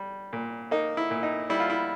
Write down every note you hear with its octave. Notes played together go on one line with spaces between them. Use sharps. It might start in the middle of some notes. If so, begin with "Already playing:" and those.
Already playing: G3
A#2
A#3 D#4
E4
A#2
D#4
G3 E4
F4
E4